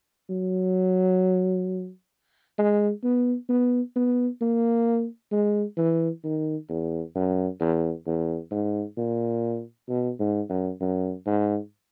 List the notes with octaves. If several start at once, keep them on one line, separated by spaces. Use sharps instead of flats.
F#3
G#3
B3
B3
B3
A#3
G#3
E3
D#3
E2
F#2
E2
E2
G#2
A#2
B2
G#2
F#2
F#2
G#2